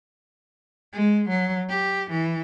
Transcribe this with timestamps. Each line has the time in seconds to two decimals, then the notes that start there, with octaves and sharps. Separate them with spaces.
0.94 G#3
1.29 F#3
1.69 G4
2.10 E3